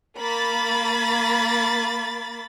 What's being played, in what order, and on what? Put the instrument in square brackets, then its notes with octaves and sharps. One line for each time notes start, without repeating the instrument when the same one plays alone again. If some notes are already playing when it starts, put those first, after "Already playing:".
[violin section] A#3 B5 A6